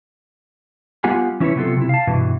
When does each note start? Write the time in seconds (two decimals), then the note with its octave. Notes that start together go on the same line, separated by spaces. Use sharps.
1.04 G3 B3 F4 G4 F#5 G#5
1.40 E3 C#4 E4 A#4 B4 C#5
1.56 C3 F#3 B3 F4 A4
1.77 C3 E4
1.89 F5 A5
2.07 G2 B2 E3